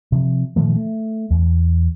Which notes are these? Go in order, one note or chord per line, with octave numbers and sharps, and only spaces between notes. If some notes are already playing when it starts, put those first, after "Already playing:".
C3 F3
A#2 D#3 F3 A3
A3
E2